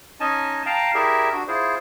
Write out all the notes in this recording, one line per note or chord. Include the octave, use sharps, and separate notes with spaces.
C#4 D#4 D#5 G#5 A5
F5 G5 A5 A#5
E4 G4 G#4 A#4 D5 E5
D4 F#4
E4 F4 G#4 C5